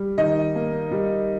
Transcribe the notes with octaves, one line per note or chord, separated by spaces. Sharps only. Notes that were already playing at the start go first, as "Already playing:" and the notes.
Already playing: G3
D#3 D#4 D#5
A#3
G3